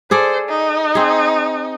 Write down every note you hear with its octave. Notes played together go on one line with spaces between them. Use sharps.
G#4 A4 C5 D5
D#4
C4 G#4